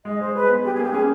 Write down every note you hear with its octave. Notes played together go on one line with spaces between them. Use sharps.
G#3 D#5
G#3 C5
G#4 B4
B3
G3 G4
G#4
A#3 G4
C#4 G#4